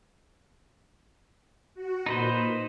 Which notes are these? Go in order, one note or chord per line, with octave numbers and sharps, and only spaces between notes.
F#4
A#2 D#4 B4 C5